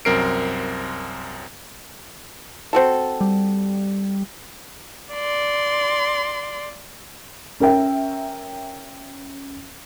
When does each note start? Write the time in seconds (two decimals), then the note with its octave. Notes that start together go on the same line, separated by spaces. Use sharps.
0.05 C2 F#2 C4 A#4 C7 D7
2.73 C4 F#4 A4
3.21 G3
5.13 D5 C6
7.60 C#4 A#4 E5 G5